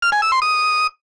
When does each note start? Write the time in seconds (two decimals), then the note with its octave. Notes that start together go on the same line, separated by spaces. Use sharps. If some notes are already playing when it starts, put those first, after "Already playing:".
0.02 F6
0.12 G#5
0.22 E6
0.32 C6
0.42 D#6